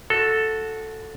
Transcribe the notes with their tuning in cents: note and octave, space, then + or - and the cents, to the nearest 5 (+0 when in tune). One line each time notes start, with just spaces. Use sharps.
F#4 -15 A4 +0